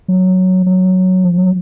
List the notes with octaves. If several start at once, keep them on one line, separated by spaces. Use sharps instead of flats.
F#3
F#3
F3
F#3